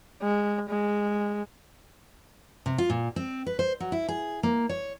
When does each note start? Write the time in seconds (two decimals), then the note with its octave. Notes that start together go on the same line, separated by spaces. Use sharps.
0.22 G#3
0.70 G#3
2.66 C3
2.78 F4
2.90 A#2
3.16 C4
3.46 B4
3.59 C5
3.80 F#3
3.92 E4
4.08 G#4
4.43 A#3
4.69 C#5